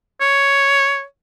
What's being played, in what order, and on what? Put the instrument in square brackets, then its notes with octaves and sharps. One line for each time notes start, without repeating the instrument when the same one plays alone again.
[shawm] C#5